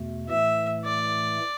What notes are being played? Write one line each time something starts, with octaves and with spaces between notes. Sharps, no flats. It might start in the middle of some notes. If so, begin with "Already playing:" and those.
Already playing: E2 B2 A3
A2 E3 A3 E5
D5